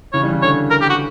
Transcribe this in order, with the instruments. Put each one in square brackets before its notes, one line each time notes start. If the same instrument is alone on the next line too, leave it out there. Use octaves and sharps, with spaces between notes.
[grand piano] C#3 E3 [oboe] C#5
[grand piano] E3 G3
C#3
[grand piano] D3 [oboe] C#5
[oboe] A#4
G4
F#4